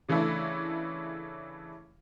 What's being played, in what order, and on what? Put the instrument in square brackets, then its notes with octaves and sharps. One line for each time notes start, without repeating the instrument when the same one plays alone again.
[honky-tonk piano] C#3 E3 A3 D4 E4